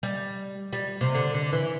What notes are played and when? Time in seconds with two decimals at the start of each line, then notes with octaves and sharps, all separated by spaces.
0.03 G3
0.73 G3
1.01 C3
1.15 D3
1.34 D3
1.53 E3